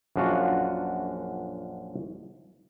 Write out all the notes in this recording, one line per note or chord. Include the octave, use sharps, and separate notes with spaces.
A#1 F#2 D4 F4 F#4 F5